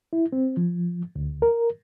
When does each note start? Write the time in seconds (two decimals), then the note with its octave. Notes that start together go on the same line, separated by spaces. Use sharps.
0.13 E4
0.32 C4
0.57 F3
1.16 D2
1.42 A#4